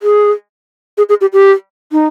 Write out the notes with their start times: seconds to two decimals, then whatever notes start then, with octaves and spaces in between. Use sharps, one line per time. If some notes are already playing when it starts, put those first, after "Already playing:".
0.02 G#4
0.97 G#4
1.09 G#4
1.21 G4
1.33 G4
1.92 D#4